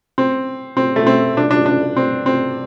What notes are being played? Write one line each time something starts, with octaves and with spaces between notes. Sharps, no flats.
C4
C4
A3
C4
D4
D4
D4
C4
C4